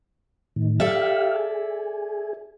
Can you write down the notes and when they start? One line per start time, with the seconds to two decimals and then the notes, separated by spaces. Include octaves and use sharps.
0.56 A2 D#3
0.80 G4 A4 D5 E5 F5
1.36 G#4